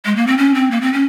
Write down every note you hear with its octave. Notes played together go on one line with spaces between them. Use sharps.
G#3
A#3
C4
C#4
C4
A#3
C4
C#4